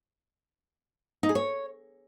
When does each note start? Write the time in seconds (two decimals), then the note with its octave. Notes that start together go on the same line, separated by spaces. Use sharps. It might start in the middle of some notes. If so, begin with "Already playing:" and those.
1.23 D#4
1.29 G#4
1.35 C#5